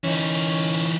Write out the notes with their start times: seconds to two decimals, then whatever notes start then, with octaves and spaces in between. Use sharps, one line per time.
0.04 E3 C#4 D#4